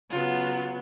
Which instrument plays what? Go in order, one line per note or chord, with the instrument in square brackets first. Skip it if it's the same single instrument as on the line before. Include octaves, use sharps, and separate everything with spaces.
[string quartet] C#3 F#3 B3 [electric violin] F4